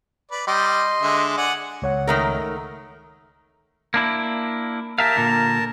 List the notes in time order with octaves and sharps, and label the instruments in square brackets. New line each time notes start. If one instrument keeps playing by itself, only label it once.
[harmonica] B4 D5
[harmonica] G3 G5 [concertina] D#5 C6
[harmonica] D3 G#3 E5
D5 F#5 G#5
[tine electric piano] C#2 C#5 F#5
[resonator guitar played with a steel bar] D#3 A3 A#4
[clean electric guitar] A#3 D4 E4
[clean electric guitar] G4 E5 F5 [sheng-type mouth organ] A#4 A5
[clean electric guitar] A#2 D3